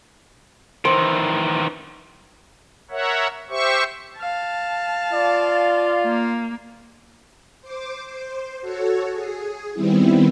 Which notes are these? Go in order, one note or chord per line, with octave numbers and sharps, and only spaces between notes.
D#3 E3 C5
A#4 C#5 E5 F#5
G4 C5 E5 C#6
F5 A5
F4 D5
A#3
C5 D6
C5
F#4 A4 C#5
G#4
D#3 G3 B3 C4 E4